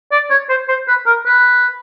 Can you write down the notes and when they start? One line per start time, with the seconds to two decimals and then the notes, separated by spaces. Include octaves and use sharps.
0.12 D5
0.30 C#5
0.49 C5
0.68 C5
0.88 B4
1.06 A#4
1.26 B4